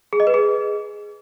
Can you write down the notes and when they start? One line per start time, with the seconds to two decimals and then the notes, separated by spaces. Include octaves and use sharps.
0.13 G#4
0.20 D#5
0.27 B4
0.34 G#4